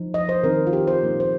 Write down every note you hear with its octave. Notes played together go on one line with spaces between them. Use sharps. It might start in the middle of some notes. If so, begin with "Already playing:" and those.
Already playing: F3 D#4
D#5
C5
D#3 C4 D#4 A#4
F4
G4
C5
A#2 F3 A#3 D#4
C5